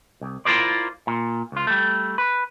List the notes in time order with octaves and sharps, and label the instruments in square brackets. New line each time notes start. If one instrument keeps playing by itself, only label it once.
[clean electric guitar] C2
E4 F4 G#4 A#4 C5 D5
A#2
C#2 F4
G3 A3
B4